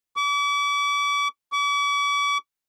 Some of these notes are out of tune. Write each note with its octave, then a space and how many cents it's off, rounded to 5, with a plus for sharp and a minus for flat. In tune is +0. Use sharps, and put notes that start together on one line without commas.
D6 -40
D6 -45